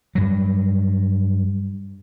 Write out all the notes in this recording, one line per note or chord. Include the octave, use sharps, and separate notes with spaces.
G2 F#3